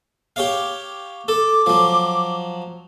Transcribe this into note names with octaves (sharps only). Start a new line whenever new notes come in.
G4 C#5 F5
A4 D6
F3 F#3